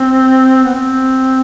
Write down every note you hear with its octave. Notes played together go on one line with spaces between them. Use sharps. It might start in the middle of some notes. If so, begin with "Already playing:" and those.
Already playing: C4
B3
C4